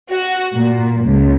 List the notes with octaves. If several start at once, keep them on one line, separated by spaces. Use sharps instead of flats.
F#4
A#2
C#2